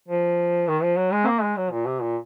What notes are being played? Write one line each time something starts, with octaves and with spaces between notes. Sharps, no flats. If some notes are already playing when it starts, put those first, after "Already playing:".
F3
D#3
F3
F#3
G#3
C4
A#3
G#3
F#3
A#2
C3
A#2